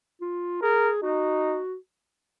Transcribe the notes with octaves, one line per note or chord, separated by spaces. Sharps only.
F4
G#4 A#4
D#4 F#4